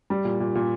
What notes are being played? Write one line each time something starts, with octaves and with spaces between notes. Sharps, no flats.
G3
A#2
A#2
A#2